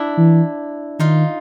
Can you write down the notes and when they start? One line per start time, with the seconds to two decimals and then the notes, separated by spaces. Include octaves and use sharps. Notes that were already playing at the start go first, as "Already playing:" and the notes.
Already playing: D4 E4
0.17 E3
1.00 D#3 D#4 F4